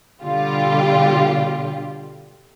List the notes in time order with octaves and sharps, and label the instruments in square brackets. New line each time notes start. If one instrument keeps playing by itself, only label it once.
[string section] B2 D3 G3 F4 G4